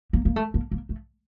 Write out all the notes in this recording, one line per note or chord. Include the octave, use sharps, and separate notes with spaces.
A#3
A#3
A3
A#3
A#3
A3